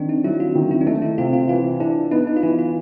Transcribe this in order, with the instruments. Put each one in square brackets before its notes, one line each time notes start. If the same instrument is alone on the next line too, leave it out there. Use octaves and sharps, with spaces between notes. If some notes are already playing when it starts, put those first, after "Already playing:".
Already playing: [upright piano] D#3 [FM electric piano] C4 D4
[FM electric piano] D#4
[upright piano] F#3 [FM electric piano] E4
[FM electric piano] F4
[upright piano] D#3
[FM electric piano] E4
D4
[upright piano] A3 [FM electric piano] D#4
[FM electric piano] E4
[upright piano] C3 [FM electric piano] F4
[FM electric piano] F4
[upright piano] E3 [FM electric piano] F4
[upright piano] D4 [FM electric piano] E4
[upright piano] B3 [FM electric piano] D#4
[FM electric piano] D#4
F4
[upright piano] E3 [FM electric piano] E4
[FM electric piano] F4